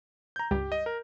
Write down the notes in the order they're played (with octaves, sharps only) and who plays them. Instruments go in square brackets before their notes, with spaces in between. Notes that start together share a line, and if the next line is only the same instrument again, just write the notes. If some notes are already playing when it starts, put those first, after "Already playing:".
[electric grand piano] A#5 G6
[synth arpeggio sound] C#2 G2 G3 [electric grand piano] G4
[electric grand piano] D#5
A#4